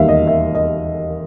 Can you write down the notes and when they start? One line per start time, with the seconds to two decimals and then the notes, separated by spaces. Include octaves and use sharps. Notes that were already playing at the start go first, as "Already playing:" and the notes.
Already playing: E1 D#2 D#3 G3 E5 F5
0.08 D#5
0.27 E5
0.55 D#5